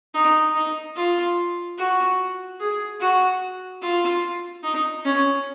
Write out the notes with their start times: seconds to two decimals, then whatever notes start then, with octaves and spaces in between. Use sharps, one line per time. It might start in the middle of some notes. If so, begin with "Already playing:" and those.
0.14 D#4
0.55 D#4
0.96 F4
1.78 F#4
2.60 G#4
3.01 F#4
3.82 F4
4.64 D#4
5.05 C#4